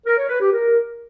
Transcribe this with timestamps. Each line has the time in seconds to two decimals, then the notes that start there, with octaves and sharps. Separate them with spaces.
0.05 A#4
0.17 C#5
0.29 B4
0.40 G4
0.52 A#4